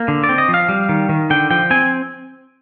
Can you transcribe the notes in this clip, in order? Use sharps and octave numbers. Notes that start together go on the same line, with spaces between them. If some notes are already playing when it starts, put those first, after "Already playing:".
Already playing: A#3
D3
D5
C4
D#5
F3
F5
G3
D#3
D#3
D3 G5
F3 G5
C4 G#5